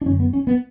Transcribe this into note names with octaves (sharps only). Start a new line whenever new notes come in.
D4
F#2 D3 C#4
B3
C#4
B3